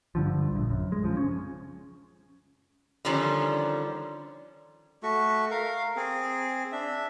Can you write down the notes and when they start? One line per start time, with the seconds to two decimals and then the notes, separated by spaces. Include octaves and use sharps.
0.15 G2 D3 F3
0.51 D1 A#1
0.70 F#2
0.92 G#3
1.04 C#3 F3
1.17 C#4
3.05 D3 D#3 F3 G3 C#4
5.03 A3 F#4 C#6
5.51 A#4 F5
5.96 C4 G#4
6.72 D4 E5